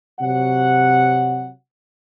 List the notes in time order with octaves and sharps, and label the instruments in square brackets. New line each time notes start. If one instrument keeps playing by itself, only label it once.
[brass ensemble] C3 F#3 F#5